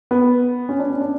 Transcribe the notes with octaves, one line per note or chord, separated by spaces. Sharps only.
B3
C#4
D4
C#4
D4